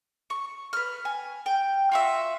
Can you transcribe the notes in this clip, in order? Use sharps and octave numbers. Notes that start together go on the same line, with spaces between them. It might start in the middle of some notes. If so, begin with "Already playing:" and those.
C#6
B4 F6
G#5
G5
F4 F#4 E5